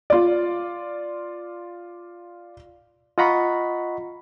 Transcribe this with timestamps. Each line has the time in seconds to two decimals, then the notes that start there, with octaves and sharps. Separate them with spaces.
0.10 F4 D5
3.18 F4 D#5 F#5 A#5 B5 C#6